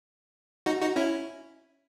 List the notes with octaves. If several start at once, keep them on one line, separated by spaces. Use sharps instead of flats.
D#4 F#4
D#4 F#4
C#4 E4